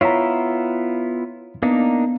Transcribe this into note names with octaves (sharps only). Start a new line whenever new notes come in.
B3 E4 F4 C#5 A#5
A#3 B3 D4 D#4